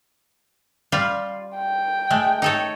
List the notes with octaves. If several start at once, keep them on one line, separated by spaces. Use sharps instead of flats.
G3 F4
G5
G#3 A3
D#4 A4 C#5